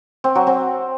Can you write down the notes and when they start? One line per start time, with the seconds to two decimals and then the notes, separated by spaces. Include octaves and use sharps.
0.24 C4
0.35 F#3
0.47 C4